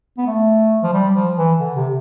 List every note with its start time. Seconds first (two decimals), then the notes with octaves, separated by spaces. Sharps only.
0.18 B3
0.27 A3
0.83 F3
0.94 G3
1.16 F3
1.37 E3
1.60 D3
1.76 C3